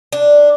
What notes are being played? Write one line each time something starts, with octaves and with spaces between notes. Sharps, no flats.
D4